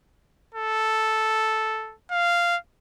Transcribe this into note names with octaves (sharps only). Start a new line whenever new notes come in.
A4
F5